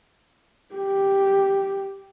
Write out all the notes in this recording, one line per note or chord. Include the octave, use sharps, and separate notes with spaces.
G4